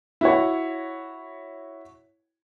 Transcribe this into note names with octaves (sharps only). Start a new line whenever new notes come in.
E4 F#4 C#5